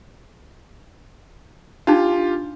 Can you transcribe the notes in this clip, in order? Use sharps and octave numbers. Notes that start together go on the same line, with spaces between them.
D4 D#4 F4 G4